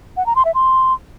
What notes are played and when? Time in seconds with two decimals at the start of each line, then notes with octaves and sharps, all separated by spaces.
0.17 F#5
0.26 A#5
0.36 C6
0.45 E5
0.54 C6